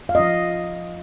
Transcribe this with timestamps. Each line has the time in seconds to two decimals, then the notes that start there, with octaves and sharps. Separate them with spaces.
0.09 F5
0.15 F3 C#4 F4 D#5